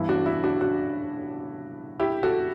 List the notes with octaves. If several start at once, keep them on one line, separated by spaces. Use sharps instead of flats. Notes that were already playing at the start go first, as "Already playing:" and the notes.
Already playing: G2 E3 B3 E4
D4 F#4
E4
D4 F#4
D4 F#4
E4 G4
F#4 A4